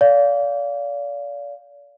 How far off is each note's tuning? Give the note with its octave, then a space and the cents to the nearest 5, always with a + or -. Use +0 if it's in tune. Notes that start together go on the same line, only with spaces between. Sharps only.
D5 -35 F5 +0